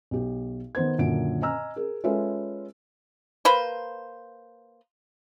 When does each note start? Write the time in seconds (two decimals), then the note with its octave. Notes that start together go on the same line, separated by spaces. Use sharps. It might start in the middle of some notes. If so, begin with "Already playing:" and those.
0.11 B1 G4
0.75 D#3 B3 C5 G#6
0.98 F#2 A#2 D3 D#3 D7
1.42 D#5 G#5 A#5 E6 F6
1.76 G#4 A#4
2.04 G#3 C#4 F4 A4 B4 E5
3.45 A#3 B4 C5